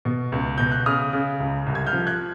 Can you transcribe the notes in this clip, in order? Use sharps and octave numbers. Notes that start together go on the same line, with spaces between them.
B2
C#2
B2 G6
F#6
C#3 D#6 F6
C#3
C#2
C2
G#6
F6 G6
F3
F#6 G#6